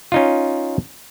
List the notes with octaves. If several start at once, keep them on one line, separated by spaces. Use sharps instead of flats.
C#4 D#4 F4